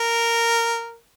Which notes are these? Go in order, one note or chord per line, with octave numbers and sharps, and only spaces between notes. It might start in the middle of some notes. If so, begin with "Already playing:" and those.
Already playing: A#4